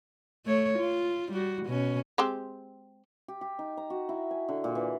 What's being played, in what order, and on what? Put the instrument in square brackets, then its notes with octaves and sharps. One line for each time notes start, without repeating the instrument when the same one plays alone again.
[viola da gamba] A3 C#5
F4
G3 F#4
B2 C#4
[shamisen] G#3 C4 G4
[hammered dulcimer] G4
G4
D#4
A#5
F#4
E4
G#5
D3
A#2
E3